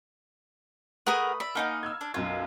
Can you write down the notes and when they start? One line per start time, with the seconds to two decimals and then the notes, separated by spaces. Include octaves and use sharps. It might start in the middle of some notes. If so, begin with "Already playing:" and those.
1.07 A3 G#4 A#4 B4 F#5 B5 D#6
1.40 D5 E5 B5
1.55 A#3 D#4 D#5 F#5 G#5 F6
1.83 E6 F6 G#6
2.01 D4
2.14 B1 F#2 F4 G#6